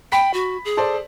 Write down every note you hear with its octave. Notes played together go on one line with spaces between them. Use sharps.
G5 B5 B6
F#4
G#4
A4 C5 D5